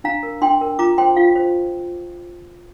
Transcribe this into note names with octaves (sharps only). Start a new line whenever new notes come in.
D4 F5 A#5
A#4
D4 G5 C6
A#4
F4 A#5 D6
C5 G5 C6
F4 F5
C5